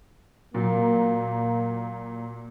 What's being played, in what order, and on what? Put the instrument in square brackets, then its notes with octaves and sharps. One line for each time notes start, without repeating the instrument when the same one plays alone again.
[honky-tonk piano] A#2 F#3 [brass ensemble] A#3